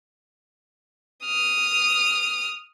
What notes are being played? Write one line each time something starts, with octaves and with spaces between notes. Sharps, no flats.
D#6 F6